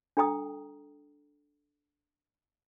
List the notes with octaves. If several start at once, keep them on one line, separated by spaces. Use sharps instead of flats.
D4 A4 G5 A#5 D#6